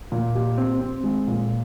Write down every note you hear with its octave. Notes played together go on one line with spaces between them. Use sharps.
A#2
G4
C4
C4
G#3
A#2